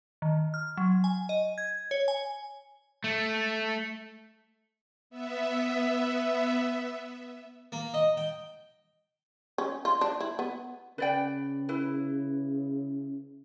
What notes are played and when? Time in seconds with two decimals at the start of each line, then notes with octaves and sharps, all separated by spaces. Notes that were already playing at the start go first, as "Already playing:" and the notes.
0.22 D#3
0.54 F6
0.77 F#3
1.04 G#5
1.29 D#5
1.58 G#6
1.91 C#5
2.08 G#5
3.04 A3
5.10 B3 E5
7.72 A#3
7.94 D#5
8.17 G5
9.58 C#4
9.85 F4
10.01 D4
10.21 E4
10.39 B3
10.98 C#3 B4 D5 G5
11.69 E4 B4